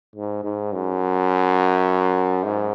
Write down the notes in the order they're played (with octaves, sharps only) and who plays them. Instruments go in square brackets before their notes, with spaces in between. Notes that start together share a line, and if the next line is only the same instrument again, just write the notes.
[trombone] G#2
G#2
F#2
G#2